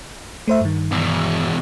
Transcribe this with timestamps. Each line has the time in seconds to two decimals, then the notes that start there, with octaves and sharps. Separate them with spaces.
0.48 A3 C5 E5
0.61 G2 D#3
0.91 E2 B2